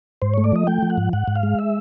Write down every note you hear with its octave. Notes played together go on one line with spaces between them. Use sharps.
G#2 C5
A3 C#5
D5
F3 D#5
A3 G5
F3
F#5
G#2
G#2 F#5
G#2
F5
G#3
E5